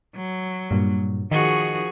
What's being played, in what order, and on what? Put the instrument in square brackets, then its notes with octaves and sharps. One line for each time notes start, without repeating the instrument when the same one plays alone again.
[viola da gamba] F#3
[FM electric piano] G2 A#2
[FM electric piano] D#3 C#6 [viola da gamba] F3 F#4 G#4